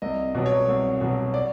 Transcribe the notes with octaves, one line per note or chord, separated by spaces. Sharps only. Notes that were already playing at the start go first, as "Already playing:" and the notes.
C2 D#5
B2 F#3
C#5
C2
B2 F#3
D5